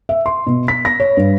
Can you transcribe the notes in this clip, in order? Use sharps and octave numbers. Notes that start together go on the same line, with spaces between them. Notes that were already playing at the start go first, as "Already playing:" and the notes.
E5
C6
B2
B6
A#6
C#5
G2